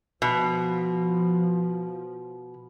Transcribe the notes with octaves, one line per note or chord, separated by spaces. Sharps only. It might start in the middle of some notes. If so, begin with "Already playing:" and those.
B2 F3